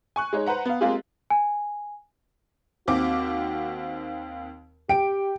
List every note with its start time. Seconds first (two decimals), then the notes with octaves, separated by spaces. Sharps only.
0.16 G#5 C#6 F#6
0.33 G#3 D#4 C#5
0.47 B4 C5 F#5 A#5
0.65 B3 F5
0.81 G#3 A#3 C4 F4 G4 G#4
1.30 G#5
2.88 D#2 C4 F#4 D6
4.89 G4 G5 D7